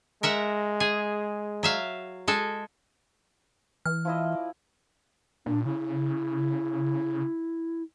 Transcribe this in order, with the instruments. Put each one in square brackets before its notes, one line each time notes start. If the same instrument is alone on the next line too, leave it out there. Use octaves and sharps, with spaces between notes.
[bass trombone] G#3 [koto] A#4 E5 F#5
[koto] G#4
F#3 E5 F5
G#3 A4
[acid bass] E3 [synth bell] F6
[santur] F3 E4 D#5
D5
[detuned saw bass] A#2 [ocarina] D4
[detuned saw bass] C#3 [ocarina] E4